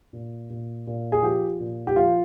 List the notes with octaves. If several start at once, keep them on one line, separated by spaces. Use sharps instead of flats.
A#2
A#2
A#2
G#4
F3 G4
A#2
G4
F3 F4